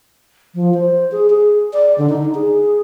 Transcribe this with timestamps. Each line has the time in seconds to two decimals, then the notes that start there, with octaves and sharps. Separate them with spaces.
0.55 F3
0.74 C5
1.12 G#4
1.30 G#4
1.73 D5
1.98 D3
2.09 D#4
2.35 G#4